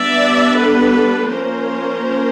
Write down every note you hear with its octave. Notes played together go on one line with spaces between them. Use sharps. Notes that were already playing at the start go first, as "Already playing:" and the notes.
Already playing: G3 B3 D4 D5 E5
A4 B4
F3 A#3 C#4 A#4 C5